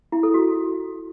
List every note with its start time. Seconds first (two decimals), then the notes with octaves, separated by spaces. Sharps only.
0.12 E4
0.23 A4
0.34 F#4